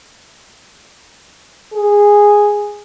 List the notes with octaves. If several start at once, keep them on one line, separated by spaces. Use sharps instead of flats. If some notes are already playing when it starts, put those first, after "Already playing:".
G#4